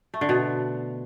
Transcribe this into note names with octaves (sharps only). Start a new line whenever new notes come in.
A3
D3
B2